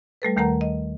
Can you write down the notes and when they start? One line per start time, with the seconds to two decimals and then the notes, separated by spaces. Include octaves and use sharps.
0.22 G3 A3 A4 B4
0.36 D#2 D#3 A3 A#4 F#5 A#5
0.61 D#5